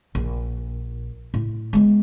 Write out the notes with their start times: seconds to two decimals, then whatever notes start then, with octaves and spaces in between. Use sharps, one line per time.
0.15 A#1
1.34 A2
1.73 G#3 B3